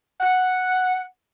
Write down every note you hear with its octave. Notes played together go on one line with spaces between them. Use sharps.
F#5